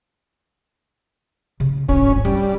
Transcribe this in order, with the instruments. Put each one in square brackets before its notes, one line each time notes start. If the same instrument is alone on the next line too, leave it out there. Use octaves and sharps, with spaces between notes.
[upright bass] C#3
[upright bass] D1 G#1 [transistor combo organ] C#4
[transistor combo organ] G3 [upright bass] C#4